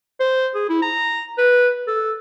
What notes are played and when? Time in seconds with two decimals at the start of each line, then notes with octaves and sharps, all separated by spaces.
0.20 C5
0.55 G#4
0.69 E4
0.82 A#5
1.38 B4
1.87 A4